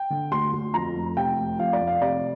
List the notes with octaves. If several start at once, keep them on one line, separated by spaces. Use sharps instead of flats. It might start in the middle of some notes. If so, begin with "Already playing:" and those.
Already playing: G5
D3
D2 C6
D2
F2 A#5
F1
C3 G5
F1
F2 F5
D5
F1
F5
C3 D5